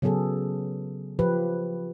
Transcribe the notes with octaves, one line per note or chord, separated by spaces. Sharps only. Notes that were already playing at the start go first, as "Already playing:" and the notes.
C#3 F#3 B3 G#4 A4
F3 G4 B4